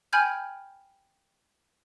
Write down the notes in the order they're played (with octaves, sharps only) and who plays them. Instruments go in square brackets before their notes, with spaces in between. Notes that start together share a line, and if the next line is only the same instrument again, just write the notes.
[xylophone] G5 G#5 B5 F6 G6 G#6